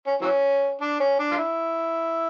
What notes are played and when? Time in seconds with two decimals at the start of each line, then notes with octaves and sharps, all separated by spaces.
0.06 C#4
0.21 E3 F#3 C#4
0.81 D4
1.00 C#4
1.19 D4
1.31 F4
1.38 E4